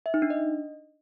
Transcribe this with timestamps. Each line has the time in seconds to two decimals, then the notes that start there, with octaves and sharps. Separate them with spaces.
0.06 E5
0.14 D#4
0.22 D4
0.30 D#5